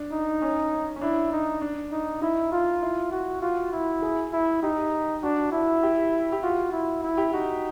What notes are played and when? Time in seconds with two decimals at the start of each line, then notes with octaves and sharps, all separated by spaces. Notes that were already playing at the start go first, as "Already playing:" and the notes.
Already playing: D4
0.12 D#4
0.42 C#4
0.96 C#4
1.01 D4 E4
1.32 D#4
1.61 D4
1.92 D#4
2.21 D#4 E4
2.52 F4
2.82 E4
3.11 F#4
3.42 F4 F#4
3.72 E4
4.02 G#4
4.32 E4
4.63 D#4 G4
5.23 D4 F#4
5.52 E4
5.83 G4
6.32 G4
6.43 F4 F#4
6.72 E4
7.03 E4
7.17 G4
7.33 D#4 F#4